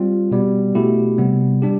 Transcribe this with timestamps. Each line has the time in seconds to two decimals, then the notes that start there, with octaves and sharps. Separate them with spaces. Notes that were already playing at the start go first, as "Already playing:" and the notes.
Already playing: G3 C4 F4
0.31 B2 G3 B3
0.75 B2 A3 E4 G4
1.18 C3 G3 B3
1.62 G3 D4 G4